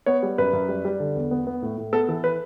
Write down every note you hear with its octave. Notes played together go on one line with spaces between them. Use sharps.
B3 C#5
G3
F#2 B4
F#2
G3
G3
D3
E2
B3
B3
A2
A2
B3 A4
E3 A4
B4